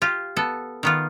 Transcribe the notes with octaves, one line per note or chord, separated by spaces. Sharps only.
F4 G4
B3 A4
D#3 B3 F4